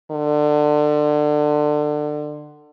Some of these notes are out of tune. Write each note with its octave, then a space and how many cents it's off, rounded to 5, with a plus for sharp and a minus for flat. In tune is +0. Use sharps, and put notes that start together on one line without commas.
D3 +25